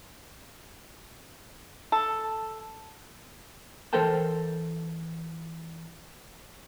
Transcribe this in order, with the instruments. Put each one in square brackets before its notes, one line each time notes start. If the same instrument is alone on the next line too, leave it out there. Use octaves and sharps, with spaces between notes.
[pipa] A4
[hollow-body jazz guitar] E3 A4 A#4 C5 G5 A5